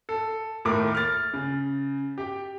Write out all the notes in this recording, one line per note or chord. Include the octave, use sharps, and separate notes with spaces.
A4
D#2 A2 A3 A#4 D6
F6 A6
C#3
G4 G5